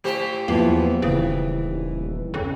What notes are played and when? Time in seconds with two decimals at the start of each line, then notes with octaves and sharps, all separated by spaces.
0.04 A2 G4 C5
0.48 E2 E3 F3 A#3 B3
1.02 D#1 C#3 E3
2.34 F2 C#3